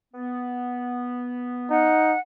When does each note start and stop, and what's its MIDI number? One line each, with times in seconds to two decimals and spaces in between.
0.14 1.91 59
1.70 2.15 63
1.70 2.20 78